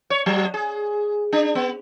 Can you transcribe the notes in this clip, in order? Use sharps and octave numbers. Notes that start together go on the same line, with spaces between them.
C#5
F#3
G#4
D4
B3